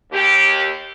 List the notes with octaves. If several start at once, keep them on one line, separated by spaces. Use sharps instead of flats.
D#2 G4